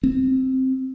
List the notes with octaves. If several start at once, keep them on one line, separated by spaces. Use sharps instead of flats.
C4